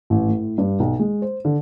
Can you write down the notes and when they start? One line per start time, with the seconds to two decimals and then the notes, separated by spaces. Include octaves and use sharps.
0.10 A1
0.28 A2
0.58 G2
0.80 B1
0.99 G#3
1.22 C5
1.45 D3